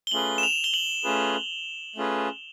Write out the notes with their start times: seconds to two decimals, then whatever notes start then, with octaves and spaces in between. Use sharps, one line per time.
0.07 G7
0.11 A3 C#4 F4 G#4 B4 F#7
0.38 E7
0.43 F7
0.64 G7
0.74 F#7
1.04 A3 C#4 F4 G#4 B4
1.96 A3 C#4 F4 G#4 B4